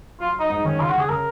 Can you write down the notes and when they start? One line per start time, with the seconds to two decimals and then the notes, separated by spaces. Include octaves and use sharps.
0.20 F#3 F4
0.35 F#3 D#4
0.50 G#2 D#4
0.65 D#3 C#4
0.79 C#3 F4
0.89 F#4
0.94 C#3
0.99 G#4
1.09 C#3 A#4